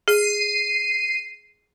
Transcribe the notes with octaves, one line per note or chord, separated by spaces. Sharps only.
G#4 C7 D#7